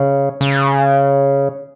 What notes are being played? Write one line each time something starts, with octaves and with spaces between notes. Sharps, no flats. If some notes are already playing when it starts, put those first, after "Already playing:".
Already playing: C#3
C#3